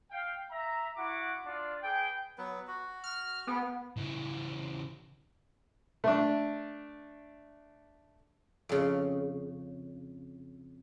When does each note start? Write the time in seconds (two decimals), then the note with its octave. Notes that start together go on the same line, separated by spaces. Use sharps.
0.11 F5 G5
0.50 E5 A#5
0.97 E4 F#4 F#5 D6
1.46 D4 F4 D5
1.82 G#4 B4 G5
2.38 F#3 B3 B4
2.67 F#4
3.04 F6
3.47 B3 G#4 G5
3.97 C#3 E3
6.04 A3 D4
8.69 F2 C#3